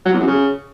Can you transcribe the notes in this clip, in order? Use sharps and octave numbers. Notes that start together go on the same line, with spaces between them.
F#3
E2
F#2
C#3